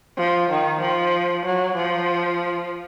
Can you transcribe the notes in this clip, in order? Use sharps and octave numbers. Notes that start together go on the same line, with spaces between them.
F3
D#3
F3
F#3
F3